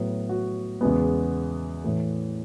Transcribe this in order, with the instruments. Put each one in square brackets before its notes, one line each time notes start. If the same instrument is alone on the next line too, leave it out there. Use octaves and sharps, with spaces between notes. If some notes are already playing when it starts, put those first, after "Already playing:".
Already playing: [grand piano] A2 F#3 B3
F#4
E2 C#3 G#3 B3
A2 E3 A3